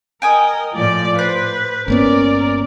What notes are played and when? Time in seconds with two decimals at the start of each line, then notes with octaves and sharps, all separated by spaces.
0.22 A#4 D#5 G5 G#5 D#6
0.74 A2 F3 D5
1.19 B4 C5
1.88 G1 A#3 B3 C#4 A#4 D5